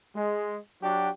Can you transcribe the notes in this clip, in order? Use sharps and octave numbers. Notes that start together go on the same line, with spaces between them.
G#3
F#3 D4 F#4 G4